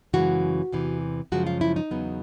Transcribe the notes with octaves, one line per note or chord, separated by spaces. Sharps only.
F#2 C#3 E3 G#3 F#4
E2 C3 E3
F#2 C#3 F3 G#3 F#4
F4
E4
D#4
E2 C#3 F#3 B3